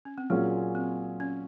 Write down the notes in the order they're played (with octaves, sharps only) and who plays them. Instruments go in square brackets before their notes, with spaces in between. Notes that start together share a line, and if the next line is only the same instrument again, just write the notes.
[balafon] C#4
C4
[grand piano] A#2 F#3 C#4 F4 G#4 [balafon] A#3
[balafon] C4
C#4